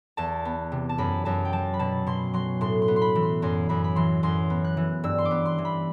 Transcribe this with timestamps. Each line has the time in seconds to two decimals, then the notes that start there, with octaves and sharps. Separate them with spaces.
0.17 E2 A5
0.45 B3
0.72 C3
0.89 A5
0.98 F#2 B5
1.25 F#2 A5
1.45 G5
1.53 F#3 A5
1.74 B5
1.79 B2 A5
2.07 B2 C6
2.34 F#3 C6
2.61 A2 C6
2.82 C6
2.88 B3
2.96 C6
3.02 B5
3.15 E3
3.22 C6
3.42 F#2 C6
3.69 F#2 B5
3.84 B5
3.96 E3 C6
4.23 F#2 C6
4.50 B3
4.64 F#6
4.77 E3
5.04 G2 E6
5.18 C6
5.25 D6
5.31 B3
5.45 C6
5.58 E3
5.65 B5